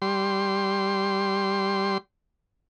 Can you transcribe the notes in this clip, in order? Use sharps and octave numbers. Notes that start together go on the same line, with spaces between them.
G3 C6